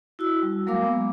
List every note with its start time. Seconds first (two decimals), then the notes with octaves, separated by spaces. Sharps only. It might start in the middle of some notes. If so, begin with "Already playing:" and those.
0.19 E4 F#4 E6
0.43 G3
0.67 F#3 G#3 A#3 A#4 F5 D6
0.84 B3